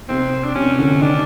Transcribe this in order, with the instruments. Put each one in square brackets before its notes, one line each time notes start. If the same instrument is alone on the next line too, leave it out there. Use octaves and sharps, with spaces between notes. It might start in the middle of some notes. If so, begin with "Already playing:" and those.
[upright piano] C3 [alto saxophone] C4
[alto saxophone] D4
[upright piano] C3 [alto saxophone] C#4
[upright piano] D3
[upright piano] D#3 [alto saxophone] D4